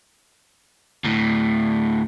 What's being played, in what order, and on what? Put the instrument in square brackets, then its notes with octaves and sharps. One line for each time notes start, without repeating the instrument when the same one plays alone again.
[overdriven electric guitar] D2 A2